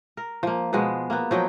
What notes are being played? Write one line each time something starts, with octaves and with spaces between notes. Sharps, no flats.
A#4
F3 A#3
B2 F3 G#3 B3
A#3 B3
F3 F#3 D#5 G5